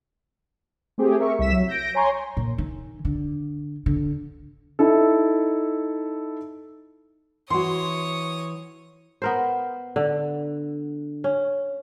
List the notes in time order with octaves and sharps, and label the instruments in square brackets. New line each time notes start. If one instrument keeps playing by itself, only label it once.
[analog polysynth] A3 C4 G4 G#4
A#4 E5 C#6
C2 E5 B6 E7
F#3
G6 A#6 D7
C#5 G#5 A#5 C6 C#6
[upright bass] A#2
D#3
D3
D3
[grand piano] D#4 E4 A4
[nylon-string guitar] E3 F#4 [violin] C#5 D#6 [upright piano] C6
[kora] B3 A#4 C5
D3
C#4